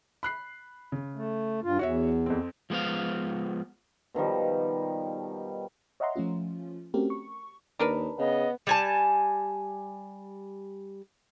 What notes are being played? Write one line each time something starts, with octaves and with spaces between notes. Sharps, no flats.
B5 F#6 C7
C#3
A3
G2 F4
E2 F#4 C#5 E5
F2 C4
F3 G#3 B3 C5 F5
B2 D#3 F3 G3
C#5 D#5 E5 F#5 A#5 C6
F3 A3 C#4 F4
A3 C4 C#4 F#4 G4 A#4
C#6
D#2 D4 A#4 B4
C#3 B3 D#5
G3 G#5 A5